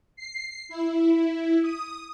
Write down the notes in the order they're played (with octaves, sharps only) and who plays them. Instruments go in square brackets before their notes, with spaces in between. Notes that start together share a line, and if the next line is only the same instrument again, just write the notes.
[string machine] C7
E4
D#6